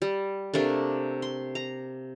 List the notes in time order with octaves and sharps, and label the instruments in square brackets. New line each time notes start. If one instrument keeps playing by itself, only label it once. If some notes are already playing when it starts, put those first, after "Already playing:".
[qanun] G3
C3 A3 A#3 D4
C6
A#5